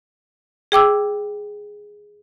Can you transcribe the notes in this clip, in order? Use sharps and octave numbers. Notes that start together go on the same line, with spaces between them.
G#4 G5 D6 E6